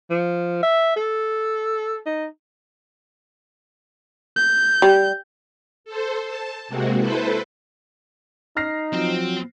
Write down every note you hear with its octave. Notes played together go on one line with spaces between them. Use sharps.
F3
E5
A4
D#4
G6
G3
A4 C5
A5
C3 G#3 A#3 C4 F#4
E4 A4 B4 C5
D#4 F6 A#6 C7
F3 F#3 C4